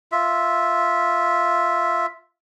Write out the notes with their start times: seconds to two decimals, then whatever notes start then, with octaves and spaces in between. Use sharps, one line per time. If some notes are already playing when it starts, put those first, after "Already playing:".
0.12 F4 E5